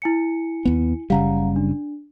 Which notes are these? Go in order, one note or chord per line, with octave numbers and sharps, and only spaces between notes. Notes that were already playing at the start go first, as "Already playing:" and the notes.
E4 G#5 C#7
D#2 B3
F#1 C#3 G3 F5 F#5 A#5
D4